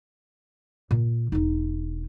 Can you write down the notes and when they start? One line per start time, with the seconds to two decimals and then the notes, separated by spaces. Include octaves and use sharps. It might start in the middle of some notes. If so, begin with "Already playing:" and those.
0.91 A#2
1.32 E1 D#4